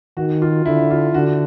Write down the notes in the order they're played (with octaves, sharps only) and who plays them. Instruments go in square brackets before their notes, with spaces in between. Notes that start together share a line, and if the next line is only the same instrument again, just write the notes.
[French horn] D#3 [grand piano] F#4
[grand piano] F4
[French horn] D3 [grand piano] E4
[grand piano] F4
[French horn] D3 [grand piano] F#4